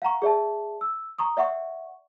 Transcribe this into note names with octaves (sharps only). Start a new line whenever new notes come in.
F5 F#5 A#5 C#6
G#4 D5 E5 A5
E6
A#5 C#6 D#6
D5 E5 F#5 C#6